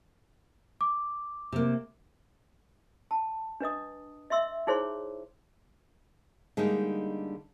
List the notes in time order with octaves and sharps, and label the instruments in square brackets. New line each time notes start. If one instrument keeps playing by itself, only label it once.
[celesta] D6
[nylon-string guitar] C3 A#3
[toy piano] A5
D4 B4 D#5 D#6
D#5 E5 C6 E6
D#4 E4 G#4 C5 C#5 C6
[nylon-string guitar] D3 G3 G#3 A#3 D#4